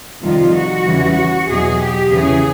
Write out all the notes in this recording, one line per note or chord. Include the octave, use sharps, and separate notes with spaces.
F2 C3 D#3 G3 F4
F#4
E2 C#3 E3 G3
E2 B2 F#3 G#4
G4
E2 C#3 E3 G#4